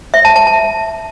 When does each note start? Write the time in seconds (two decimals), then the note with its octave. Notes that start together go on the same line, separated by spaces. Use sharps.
0.14 E5
0.25 A5
0.36 A5
0.47 A5